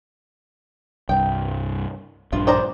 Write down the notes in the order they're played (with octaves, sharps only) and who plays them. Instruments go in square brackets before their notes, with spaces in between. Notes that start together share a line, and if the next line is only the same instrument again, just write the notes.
[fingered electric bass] C2 G2 [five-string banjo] G5
[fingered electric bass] A#1 G2 D4 [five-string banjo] F4
[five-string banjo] C5 D5 A#5